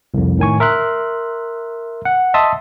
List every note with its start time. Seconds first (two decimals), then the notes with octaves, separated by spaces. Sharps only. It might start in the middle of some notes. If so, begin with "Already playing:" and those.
0.14 C2 F2
0.38 A2 D#3 G#5 C#6
0.60 A#4 E5 C6 F#6
2.05 F#5
2.34 D#5 E5 A5 C6 D#6